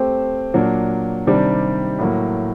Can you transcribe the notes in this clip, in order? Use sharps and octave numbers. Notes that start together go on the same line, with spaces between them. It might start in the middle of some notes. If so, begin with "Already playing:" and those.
Already playing: A3 C4 G4 C5
A#2 F#3 A#3 D4
C3 D#3 G3 D4
A2 F#3 A#3